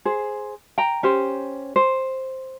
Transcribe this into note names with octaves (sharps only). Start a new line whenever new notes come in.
G#4 C5
G5 A#5
C#4 G4 C5
C5